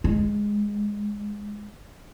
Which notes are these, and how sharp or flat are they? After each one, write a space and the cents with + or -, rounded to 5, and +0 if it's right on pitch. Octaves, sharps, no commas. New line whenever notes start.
G#3 -5